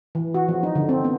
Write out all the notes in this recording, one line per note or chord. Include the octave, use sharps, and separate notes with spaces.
E3
F#4
F3
D#4
D3
C4
B3